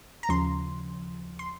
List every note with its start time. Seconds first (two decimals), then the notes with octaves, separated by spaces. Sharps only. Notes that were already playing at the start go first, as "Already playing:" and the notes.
0.23 A#5
0.29 D#2 C#3 F3 C6
1.39 C6